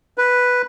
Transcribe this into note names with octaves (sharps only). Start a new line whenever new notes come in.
B4